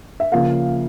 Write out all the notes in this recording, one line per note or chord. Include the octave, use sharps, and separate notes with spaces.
E5
C#3 F3 A#3 F5